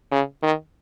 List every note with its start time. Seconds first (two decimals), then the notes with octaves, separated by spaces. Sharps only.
0.11 C#3
0.43 D#3